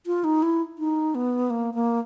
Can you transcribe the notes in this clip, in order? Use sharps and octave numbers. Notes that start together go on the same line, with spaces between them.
F4
D#4
E4
D#4
B3
A#3
A#3